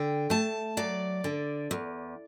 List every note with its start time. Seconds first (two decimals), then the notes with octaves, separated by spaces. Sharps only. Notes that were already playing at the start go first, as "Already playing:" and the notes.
Already playing: D3 G5
0.30 A3 A5
0.77 F#3 D5
1.24 D3
1.71 E2